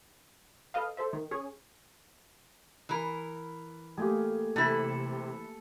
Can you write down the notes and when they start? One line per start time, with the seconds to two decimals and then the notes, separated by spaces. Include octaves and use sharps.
0.74 A4 B4 D#5 F5
0.97 A4 C5 E5
1.13 D#3
1.31 C#4 G#4 C#5
2.89 E3 A#4
3.97 A3 A#3 G4 G#4
4.56 C3 E3 E4 A4